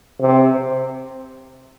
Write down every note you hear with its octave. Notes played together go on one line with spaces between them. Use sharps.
C3